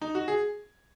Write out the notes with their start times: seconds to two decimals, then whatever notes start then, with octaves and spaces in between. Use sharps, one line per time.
0.02 D#4
0.15 F#4
0.28 G#4